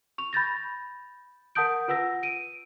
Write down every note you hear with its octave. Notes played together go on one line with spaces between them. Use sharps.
C#6 F7
B5 G6 A6 A#6
A#4 F#5 A5 D#6 G6 D7
F4 B4 F#5 E6 A#6
D7 D#7